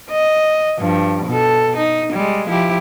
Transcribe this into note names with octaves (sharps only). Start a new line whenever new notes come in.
D#5
G2 F3
B2 A4
D#4
G3 G#3
F3 E4 G4